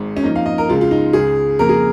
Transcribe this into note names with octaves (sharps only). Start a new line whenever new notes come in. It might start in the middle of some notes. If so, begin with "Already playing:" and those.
Already playing: G#1 G#2
C#4
F2 F3 A#3 D#4
F5
D#5
A#4
C#2 C#3 G#3 F4
F4
D#4
C#2 C#3 G#3 G#4
F2 C#3 A#3 A#4
G#4